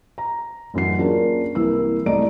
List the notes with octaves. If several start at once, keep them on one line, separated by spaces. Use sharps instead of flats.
A#5
A1 F#2 F#3 C7
A#3 C#4 D4 F4 G#4 A#4
C2 E3 A#3 E4 A#4 E6
C2 A3 D5 D#5 A#5 D7